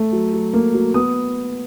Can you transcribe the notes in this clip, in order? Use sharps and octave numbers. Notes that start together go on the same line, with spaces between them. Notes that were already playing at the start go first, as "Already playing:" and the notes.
Already playing: A3
F#3
F#3
A#3
F#3
B3 D#6